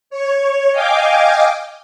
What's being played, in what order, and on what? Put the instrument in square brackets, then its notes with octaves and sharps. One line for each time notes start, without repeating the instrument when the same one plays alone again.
[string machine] C#5
D#5 F5 G5 G#5 D6